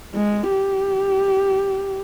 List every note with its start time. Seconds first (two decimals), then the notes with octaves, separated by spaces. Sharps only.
0.14 G#3
0.51 G4